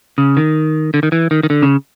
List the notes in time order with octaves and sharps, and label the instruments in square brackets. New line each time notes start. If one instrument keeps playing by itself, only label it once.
[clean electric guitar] C#3
D#3
D3
D#3
E3
D#3
D#3
D3
C#3